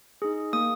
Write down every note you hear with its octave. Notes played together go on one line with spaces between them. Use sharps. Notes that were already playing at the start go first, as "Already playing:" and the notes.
D#4 G#4
A#3 D#6